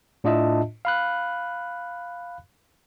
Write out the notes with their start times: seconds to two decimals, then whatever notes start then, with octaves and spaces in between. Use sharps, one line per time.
0.24 A2 D4 F4 D#5 E5 A5
0.85 F5 B5 F#6